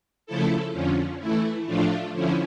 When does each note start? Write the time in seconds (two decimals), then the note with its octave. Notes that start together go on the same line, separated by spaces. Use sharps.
0.26 C#3 F3 A3 E4 A4
0.73 F2 D3 F3 C#4
1.19 E3 A3 E4
1.66 A2 F3 A3 D4 F4
2.13 D3 F3 C#4 E4